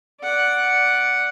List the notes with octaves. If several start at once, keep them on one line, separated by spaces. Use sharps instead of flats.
D5 F#5